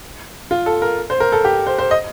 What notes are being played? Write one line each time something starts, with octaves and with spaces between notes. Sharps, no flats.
F4
A4
A#4
C5
A#4
A4
G4
C5
C5
D#5